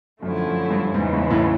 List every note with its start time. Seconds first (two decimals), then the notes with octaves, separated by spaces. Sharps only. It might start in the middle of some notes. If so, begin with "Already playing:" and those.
0.22 F#2 D3 F3 A3 C#4 E4
0.47 F#2
0.71 G2
0.94 E2 G#2 C#3 E3 G#3
1.13 G#2
1.30 A2